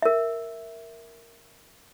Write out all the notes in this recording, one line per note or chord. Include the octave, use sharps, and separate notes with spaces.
A#4 E5